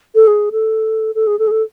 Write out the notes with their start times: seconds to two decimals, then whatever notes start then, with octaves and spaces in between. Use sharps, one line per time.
0.15 A4
0.27 G#4
0.52 A4
1.15 A4
1.27 G#4
1.39 A4
1.47 G#4
1.51 A4